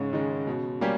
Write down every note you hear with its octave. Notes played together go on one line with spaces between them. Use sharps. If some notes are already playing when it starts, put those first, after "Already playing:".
Already playing: G#2 C#3
D#3 G#3
B2
G3 A#3 C#4 G4